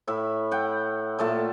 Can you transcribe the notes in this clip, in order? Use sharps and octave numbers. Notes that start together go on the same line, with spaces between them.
A2 E5 B5
F#5 G5
A#2 A3 A5